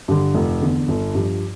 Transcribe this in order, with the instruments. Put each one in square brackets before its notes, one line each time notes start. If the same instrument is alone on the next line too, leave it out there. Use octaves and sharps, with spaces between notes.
[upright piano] G2 D3
F1
E2 D3
G1
G2 F3